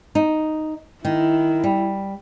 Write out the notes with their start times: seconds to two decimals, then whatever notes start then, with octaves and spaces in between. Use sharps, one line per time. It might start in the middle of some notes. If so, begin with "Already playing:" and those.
0.15 D#4
1.05 D#3 E4
1.64 G3